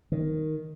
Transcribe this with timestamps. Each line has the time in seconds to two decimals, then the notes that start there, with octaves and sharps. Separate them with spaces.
0.12 D#3